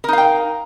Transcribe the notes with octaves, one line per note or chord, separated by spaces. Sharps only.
D#4 A#4 F5 G5